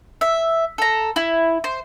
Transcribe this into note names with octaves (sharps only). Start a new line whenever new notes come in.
E5
A4 A#5
E4
C5